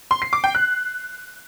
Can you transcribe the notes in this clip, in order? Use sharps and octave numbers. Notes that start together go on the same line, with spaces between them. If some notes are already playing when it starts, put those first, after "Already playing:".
C6
C7
D6
G5
F#6